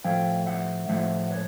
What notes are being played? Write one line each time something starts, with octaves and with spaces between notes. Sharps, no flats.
A2 F3 A3 F5 G5
E5 F#5
A2 F3 A3 E5 F#5
B4 C#5